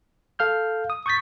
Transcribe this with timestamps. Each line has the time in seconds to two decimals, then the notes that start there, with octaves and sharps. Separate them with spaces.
0.39 A4 F5 F6 G6
0.90 D#6
1.06 C#6 D#6 G6 A6 B6